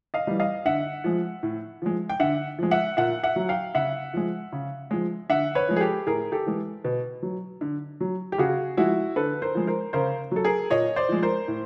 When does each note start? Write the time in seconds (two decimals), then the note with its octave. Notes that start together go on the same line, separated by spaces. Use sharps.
0.14 D#5 F5
0.27 E3 G3
0.40 D#5 F5
0.65 D3 E5 F#5
1.04 F3 G#3
1.43 A2
1.82 F3 G#3
2.09 G5
2.20 D3 E5 F#5
2.59 F3 G#3
2.71 E5 F#5
2.97 A#2 E5 F#5
3.23 E5 F#5
3.36 F#3
3.49 F5 G5
3.75 C#3 E5 F#5
4.14 F3 G#3
4.52 C#3
4.91 F3 G#3
5.30 D3 E5 F#5
5.55 B4 C#5
5.68 F3 G#3
5.76 G#4
5.81 G4 A4
6.07 A2 G#4 A#4
6.32 G4 A4
6.46 E3 G#3
6.84 B2
7.23 F#3
7.61 D3
8.00 F#3
8.32 G4
8.38 C#3 F#4 G#4
8.77 F3 G#3 E4 F#4
9.16 D3 A4 B4
9.42 A#4 C5
9.55 F3 G#3
9.67 A#4 C5
9.93 C#3 A#4 C5
10.31 F#3 A4
10.45 G#4 A#4
10.70 A#2 C#5 D#5
10.96 C5 D5
11.09 F3 G#3
11.22 A#4 C5
11.48 A2